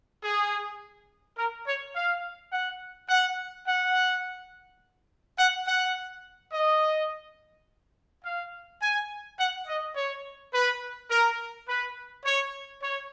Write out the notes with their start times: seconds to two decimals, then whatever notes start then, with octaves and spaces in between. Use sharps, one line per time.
0.23 G#4
1.38 A#4
1.66 C#5
1.95 F5
2.52 F#5
3.09 F#5
3.66 F#5
5.38 F#5
5.67 F#5
6.52 D#5
8.24 F5
8.81 G#5
9.38 F#5
9.67 D#5
9.95 C#5
10.52 B4
11.10 A#4
11.67 B4
12.24 C#5
12.82 C#5